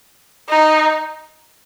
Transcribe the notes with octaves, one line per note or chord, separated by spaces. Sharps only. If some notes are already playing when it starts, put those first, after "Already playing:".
D#4